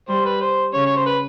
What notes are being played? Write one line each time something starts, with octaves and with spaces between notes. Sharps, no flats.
G3 C5
B4
C5
C#3 C#5
C#5
C5
B4